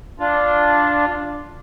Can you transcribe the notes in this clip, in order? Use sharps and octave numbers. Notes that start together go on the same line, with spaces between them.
D4 F4